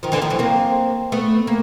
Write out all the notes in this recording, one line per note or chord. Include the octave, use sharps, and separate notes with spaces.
D#3 F3
D3 E3
D#3 F3
E3 F#3
A#3 C4
A3 B3
A#3